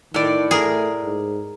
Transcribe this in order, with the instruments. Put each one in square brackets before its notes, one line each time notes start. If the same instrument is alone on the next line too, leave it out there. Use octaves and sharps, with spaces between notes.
[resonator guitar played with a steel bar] A2 D5 [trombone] D#3
[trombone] A3 [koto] G#4 A#4
[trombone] G#2